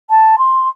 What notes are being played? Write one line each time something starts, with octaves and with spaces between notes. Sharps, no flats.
A5
C6